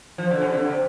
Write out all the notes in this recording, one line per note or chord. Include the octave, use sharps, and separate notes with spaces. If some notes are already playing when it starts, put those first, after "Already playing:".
F3
D3
C3
D3
C3